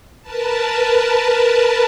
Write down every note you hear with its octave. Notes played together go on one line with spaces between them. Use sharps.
A#4 B4 A5